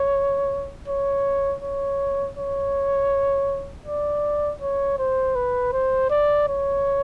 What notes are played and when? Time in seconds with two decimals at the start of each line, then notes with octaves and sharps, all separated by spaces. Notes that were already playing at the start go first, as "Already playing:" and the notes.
Already playing: C#5
0.88 C#5
1.63 C#5
2.37 C#5
3.86 D5
4.61 C#5
4.98 C5
5.35 B4
5.73 C5
6.11 D5
6.49 C#5